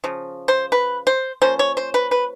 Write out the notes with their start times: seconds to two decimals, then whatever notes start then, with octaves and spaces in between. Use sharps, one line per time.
0.04 C#3 F3
0.48 C5
0.72 B4
1.07 C5
1.42 F3 A#3 C#4 C5
1.59 C#5
1.77 C5
1.94 B4
2.11 B4